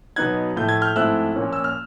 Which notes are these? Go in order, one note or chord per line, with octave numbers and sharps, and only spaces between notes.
B2 F#3 B3 D#4 F#6 G#6
A2 F3 A3 G6
G#6
F6 G6
G#2 F3 A3 C4 E4 E6 F#6
A#2 F3 A#3 C#4
E6
F6